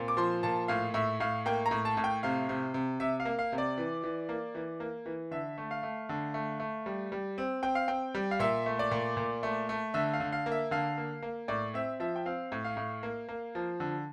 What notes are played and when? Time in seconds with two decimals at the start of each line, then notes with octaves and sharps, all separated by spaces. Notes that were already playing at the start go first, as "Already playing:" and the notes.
Already playing: A#2 C4
0.08 D6
0.17 F3 C6
0.43 A#2 A5
0.68 A2 F5
0.94 A2 E5
1.20 A2 F5
1.46 A#3 G5
1.66 A#5
1.71 A2
1.85 A5
1.97 A2
2.04 G5
2.23 C3 F5
2.49 C3
2.74 C3
3.00 C3 E5
3.20 F5
3.25 A#3
3.39 F5
3.52 C3
3.58 D5
3.78 E3
4.04 E3
4.29 A#3
4.55 E3
4.80 A#3
5.06 E3
5.31 D3 E5
5.58 A3
5.71 F5
5.83 A3
6.09 D3
6.34 A3
6.60 A3
6.86 G3
7.12 G3
7.38 C4
7.63 C4 G5
7.75 F5
7.88 C4 G5
8.15 G3
8.31 F5
8.40 A#2 E5
8.66 A3
8.79 D5
8.91 A#2
9.17 A#2
9.43 A3
9.69 A3
9.94 D3 E5
10.13 F5
10.20 D3
10.32 F5
10.46 A#3
10.52 E5
10.71 D3 F5
10.98 A#3
11.22 A#3
11.48 A2 D5
11.74 C4 E5
12.00 F3 E5
12.16 G5
12.26 C4 F5
12.52 A2
12.64 F5
12.77 A2
13.03 A#3
13.29 A#3
13.55 F3
13.80 D3